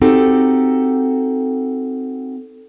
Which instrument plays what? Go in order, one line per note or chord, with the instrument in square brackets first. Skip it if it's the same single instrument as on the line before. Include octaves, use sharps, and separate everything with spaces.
[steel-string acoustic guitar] C4 D#4 F#4 G4 A4